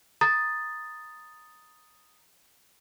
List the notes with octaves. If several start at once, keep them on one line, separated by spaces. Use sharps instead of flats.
A#5 D#6 A6